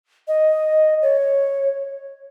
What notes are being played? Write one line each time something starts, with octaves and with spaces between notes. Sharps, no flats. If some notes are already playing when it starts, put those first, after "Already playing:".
D#5
C#5